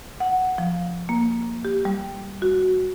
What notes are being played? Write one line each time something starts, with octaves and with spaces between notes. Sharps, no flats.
F#5
F3
A#3
G4
G3
F#4